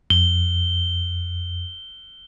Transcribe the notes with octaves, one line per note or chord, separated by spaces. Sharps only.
F2 G7